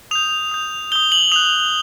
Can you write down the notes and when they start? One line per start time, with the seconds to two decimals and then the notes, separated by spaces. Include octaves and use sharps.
0.11 D#6 G6 F7
0.51 D#6 G6
0.92 D#6 G6 G7
1.12 F#7
1.32 D#6 F#6 F7